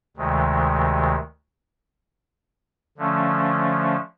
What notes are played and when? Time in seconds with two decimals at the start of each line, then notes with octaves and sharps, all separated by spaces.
0.16 D2 C3 D#3 G#3
2.98 D3 F3 A3 C#4